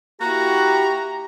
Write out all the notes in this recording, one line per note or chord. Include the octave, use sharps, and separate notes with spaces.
A#3 E4 F#4 G4 A#5